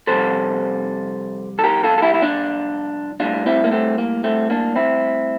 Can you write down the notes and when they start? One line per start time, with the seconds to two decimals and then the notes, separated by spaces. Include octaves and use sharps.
0.07 F2 C3 G3 A4 C5
1.59 A4
1.64 G4 A#4
1.84 F4 A4
1.98 A4
2.02 E4 G4
2.14 E4
2.22 D4 F4
3.20 A2 G3 D4 F4
3.46 C4 E4
3.64 A#3
3.72 A3 C4
3.98 A#3
4.24 A3 C4
4.50 A#3 D4
4.76 C4 E4